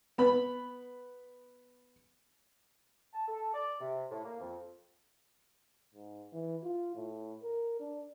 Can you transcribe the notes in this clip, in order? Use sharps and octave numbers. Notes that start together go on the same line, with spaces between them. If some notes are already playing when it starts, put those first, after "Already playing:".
B3 B5
A5
A4
D5
C3
A2
A#3
F2
G#2
E3
F4
A2
A#4
D4